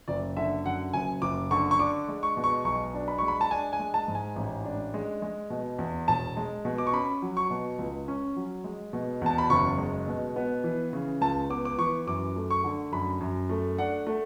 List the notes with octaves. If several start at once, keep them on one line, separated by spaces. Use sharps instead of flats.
F#1 D5
D3 E5
F#2 F#5
F#1 G#5
F#1 D6
D3 C#6
C#6
D4 D6
G#3
C#6
B2
C#6
B1 C#6
D4
B5
G#3 C#6
B5
A5
D4 G#5
G#5
G#3
A5
G#2
G#5
A1
D4
G#3
G#3
B2
E2
E1 A5
G#3
B2
D6
C#6
C#4 B5
F#3
C#6
B2
C#2
C#4
F#3
G#3
B2
E2 A5
B5
F#1 C#6
G#3
B2
B3
E3
C#3
C#2 A5
B3 D6
D6
E3 C#6
F#2 D6
A3
C#6
D3
F#2 B5
F#2
A3
D4 F#5
A3